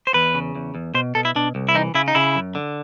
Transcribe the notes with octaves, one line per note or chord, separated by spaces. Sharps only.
C5
E2 B4
C#3
E2
E2
B2 C5
B2 A4
E4
B2 D4
C2
E4
E3 D#4
C#3 E4
D#4
C#3 E4
F#2
D3